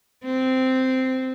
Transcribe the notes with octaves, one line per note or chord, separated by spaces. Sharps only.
C4